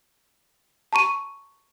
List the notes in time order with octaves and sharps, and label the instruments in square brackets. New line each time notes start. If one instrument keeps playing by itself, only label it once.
[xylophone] A5 A#5 C#6 D#7